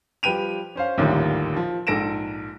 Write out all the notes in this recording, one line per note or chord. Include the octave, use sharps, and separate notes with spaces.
F3 G3 B4 G5 D#7 F7
C#4 C5 F5
A1 D#2 A#2 D3 D#3 G3
F3
A#1 G#2 A4 A#6 D7 E7